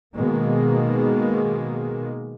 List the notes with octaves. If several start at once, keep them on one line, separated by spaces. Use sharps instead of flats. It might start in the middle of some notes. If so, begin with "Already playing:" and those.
B2 D#3 G#3 A#3